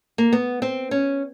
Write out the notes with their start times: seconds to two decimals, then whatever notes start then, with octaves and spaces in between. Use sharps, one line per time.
0.18 A#3
0.33 B3
0.62 C4
0.91 C#4